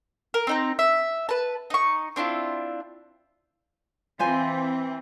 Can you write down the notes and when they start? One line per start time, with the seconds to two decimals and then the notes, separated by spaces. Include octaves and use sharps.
0.34 A#4
0.47 C4 D#4 A#5
0.79 E5
1.29 B4 A5
1.70 D#4 C#6
2.16 C4 D4 E4 F4
4.19 E3 C4 F4 C5 G#5